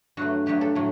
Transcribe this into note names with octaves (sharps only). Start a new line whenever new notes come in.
G2 F#3 A3 F#4
G2 F#3 A3 G4
A4
A2 F#3 A3